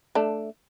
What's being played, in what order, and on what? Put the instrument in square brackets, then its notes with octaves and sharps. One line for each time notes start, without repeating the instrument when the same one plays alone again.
[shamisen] A3 D4